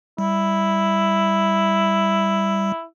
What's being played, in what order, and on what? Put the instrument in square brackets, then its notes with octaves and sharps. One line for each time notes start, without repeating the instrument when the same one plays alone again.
[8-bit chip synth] G3 [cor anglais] E4